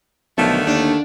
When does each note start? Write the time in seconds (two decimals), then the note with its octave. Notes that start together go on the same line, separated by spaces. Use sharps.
0.38 B1 D3 D#3 F3 A3
0.67 D#2 D4